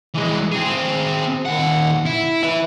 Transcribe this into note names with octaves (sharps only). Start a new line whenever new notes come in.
E3 G#3
C4 G#4
D#2 F#5
E4
B4 E5